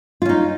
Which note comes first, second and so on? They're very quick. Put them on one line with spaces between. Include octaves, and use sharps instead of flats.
F4 C#4 D#4